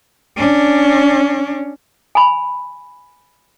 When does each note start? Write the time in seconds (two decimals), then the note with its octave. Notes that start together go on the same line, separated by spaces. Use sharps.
0.37 C#4 D4
2.15 G#5 B5